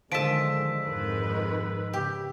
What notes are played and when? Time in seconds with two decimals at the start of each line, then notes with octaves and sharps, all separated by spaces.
0.12 D3 D#3 F3 G#3 A5 E6 B6 D7
0.84 G#1 F2 G#2 D#3 G#3 B4
1.93 C#3 G4